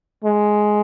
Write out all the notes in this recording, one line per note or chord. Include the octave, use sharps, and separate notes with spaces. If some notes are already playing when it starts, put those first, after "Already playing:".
G#3